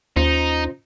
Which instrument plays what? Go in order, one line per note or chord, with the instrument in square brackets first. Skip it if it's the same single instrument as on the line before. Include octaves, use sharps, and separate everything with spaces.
[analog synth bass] D#2 [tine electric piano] C#4 F4 C5 [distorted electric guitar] D#4